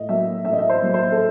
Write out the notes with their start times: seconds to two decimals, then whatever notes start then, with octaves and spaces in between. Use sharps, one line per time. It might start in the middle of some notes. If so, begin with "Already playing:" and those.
Already playing: A2 D#5
0.09 F#3 A#3 E5
0.45 A2 E5
0.53 D#5
0.59 E5
0.69 C5
0.82 F#3 A#3
0.94 C5
1.12 A4